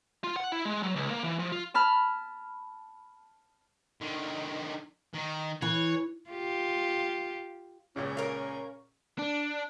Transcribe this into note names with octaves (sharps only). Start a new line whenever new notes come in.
F4
F#5
E4
G#3
F#3
C#2
A#3
E3
F3
F4
A5 B5 F6
D3 D#3
D#3 D#4
E3 C#5
F4 G4
C#2 A#2 C#3 C#4
A#4 F5
D4